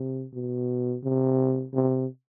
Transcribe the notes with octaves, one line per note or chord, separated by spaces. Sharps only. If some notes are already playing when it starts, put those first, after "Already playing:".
Already playing: C3
B2
C3
C3